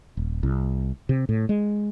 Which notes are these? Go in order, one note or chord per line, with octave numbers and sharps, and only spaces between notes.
D#1
C2
C3
A2
G#3